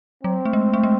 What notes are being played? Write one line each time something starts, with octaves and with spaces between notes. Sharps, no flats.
F#3 C4
A3
G#3
A3
G#3